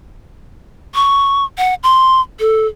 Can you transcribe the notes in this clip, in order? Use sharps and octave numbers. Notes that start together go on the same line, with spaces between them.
C#6
F#5
C6
A4